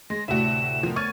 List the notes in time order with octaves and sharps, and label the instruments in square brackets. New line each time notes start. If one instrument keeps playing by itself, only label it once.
[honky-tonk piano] G#3 [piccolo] A#6
[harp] D2 A2 C3 [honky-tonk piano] E4 F#4 [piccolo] E7
[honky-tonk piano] F3 [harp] B3 A#4
[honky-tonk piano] C#6 G#6 D#7 [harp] F6 [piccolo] A6